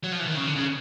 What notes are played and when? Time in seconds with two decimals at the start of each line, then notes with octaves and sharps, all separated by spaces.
0.04 F#3
0.12 F3
0.20 E3
0.27 D#3
0.38 C#3
0.47 D3
0.56 C#3